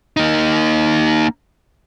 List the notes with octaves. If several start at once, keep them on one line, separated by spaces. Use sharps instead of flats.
A#3 D#4